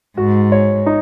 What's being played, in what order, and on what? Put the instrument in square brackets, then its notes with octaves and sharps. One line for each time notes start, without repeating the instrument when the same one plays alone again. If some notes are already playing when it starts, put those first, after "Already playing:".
[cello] G#2 [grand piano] F#4
[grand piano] C#5
D#4